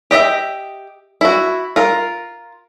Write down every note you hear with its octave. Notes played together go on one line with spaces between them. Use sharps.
G4 D#5 E5 G5
E4 F#4
F4 A#4